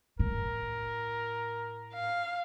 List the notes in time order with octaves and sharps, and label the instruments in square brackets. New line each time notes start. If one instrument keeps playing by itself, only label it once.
[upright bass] A2 [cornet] A#4
[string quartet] F5